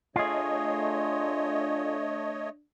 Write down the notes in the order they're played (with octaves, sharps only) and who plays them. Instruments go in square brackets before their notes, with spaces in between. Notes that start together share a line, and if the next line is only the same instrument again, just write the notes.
[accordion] A3 C#5 D#5 [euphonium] D4 [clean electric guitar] F4 G#4